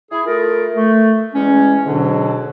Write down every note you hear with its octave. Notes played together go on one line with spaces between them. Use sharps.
E4 G#4
A3 F4 A#4
A3
E2 G#3 C#4
G#2 B2 D3 F#3 D4